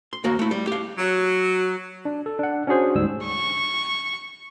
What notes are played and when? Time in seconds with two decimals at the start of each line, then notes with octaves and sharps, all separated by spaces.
0.13 C6
0.24 D#2 A#3 F#4
0.39 A3 E4
0.51 G3
0.67 G4 F5
0.98 F#3
2.05 D4
2.26 A4
2.39 D4 F#5
2.67 C#4 D4 F#4 G#4 C5
2.95 D2 G#2 G3 E6
3.27 C#6